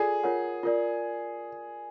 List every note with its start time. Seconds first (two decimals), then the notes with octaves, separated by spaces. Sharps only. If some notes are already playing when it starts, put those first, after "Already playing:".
Already playing: F4 G#4 A4 D5
0.23 F4 A#4 C#5 F#5
0.63 F4 A#4 D5